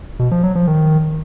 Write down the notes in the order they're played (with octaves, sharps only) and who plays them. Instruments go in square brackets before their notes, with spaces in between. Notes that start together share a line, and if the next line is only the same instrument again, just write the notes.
[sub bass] B2
F3
F#3
F3
D#3